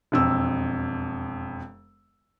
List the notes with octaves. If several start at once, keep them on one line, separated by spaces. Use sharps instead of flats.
E1 F2 E6